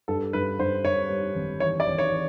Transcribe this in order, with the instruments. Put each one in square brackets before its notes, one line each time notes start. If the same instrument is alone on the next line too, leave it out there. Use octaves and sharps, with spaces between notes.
[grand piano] G2 [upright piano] A4
[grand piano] G2 [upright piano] B4
[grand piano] G2 [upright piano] C5
[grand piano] G2 [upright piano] C#5
[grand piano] G3
G#1
[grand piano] E3 [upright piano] C#5
[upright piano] D5
[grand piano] G#1
[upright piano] C#5
[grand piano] E3